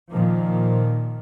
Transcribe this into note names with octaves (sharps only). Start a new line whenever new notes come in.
A#2 D#3 F3